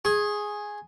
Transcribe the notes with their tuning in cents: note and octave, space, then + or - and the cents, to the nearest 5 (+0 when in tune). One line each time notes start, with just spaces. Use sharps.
G#4 +0 C#6 -40